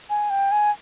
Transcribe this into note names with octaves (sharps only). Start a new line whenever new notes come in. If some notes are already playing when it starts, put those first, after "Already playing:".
G#5
G5
G#5